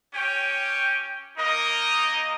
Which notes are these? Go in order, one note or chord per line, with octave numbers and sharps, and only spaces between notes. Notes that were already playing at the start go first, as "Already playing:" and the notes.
C#4 G4 C#5 G5
A#3 D#4 A#4 D#5